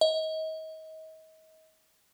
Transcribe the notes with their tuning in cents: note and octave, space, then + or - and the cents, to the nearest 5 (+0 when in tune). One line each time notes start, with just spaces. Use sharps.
D#5 +35